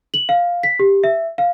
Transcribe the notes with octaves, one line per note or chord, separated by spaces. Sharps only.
F#7
F5
B6
G4
E5
F5